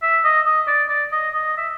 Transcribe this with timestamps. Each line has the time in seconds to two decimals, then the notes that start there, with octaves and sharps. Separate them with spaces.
0.02 E5
0.25 D#5
0.46 D#5
0.68 D5
0.89 D5
1.12 D#5
1.34 D#5
1.57 E5